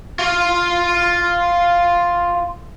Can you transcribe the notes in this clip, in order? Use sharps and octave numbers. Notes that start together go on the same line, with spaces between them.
F4 F5